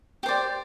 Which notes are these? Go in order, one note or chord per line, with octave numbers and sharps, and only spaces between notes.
G4 C5 D5